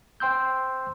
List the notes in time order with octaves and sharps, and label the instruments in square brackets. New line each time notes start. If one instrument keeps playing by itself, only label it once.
[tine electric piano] C5 G5 C6 E6 G6